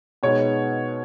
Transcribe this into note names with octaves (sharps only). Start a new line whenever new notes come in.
B2 G#3 B3 D#4 C#5